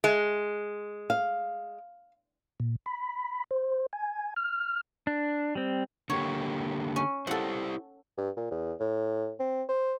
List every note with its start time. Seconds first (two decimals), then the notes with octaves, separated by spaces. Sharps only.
0.04 G#3
1.10 F5
2.60 A#2
2.86 B5
3.51 C5
3.93 G#5
4.36 F6
5.07 D4
5.55 G3 C4
6.10 D3 A#3 G4 C#5
6.96 C#4
7.27 E4 G4 A4 C5 F#5
8.18 G2
8.37 A#2
8.51 E2
8.80 A2
9.40 C4
9.69 C5